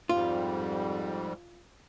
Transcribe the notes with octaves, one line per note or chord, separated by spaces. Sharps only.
F2 G#2 G3 F4